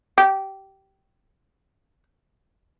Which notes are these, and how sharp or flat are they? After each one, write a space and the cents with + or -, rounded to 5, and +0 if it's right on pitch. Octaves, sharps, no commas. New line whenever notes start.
G4 -20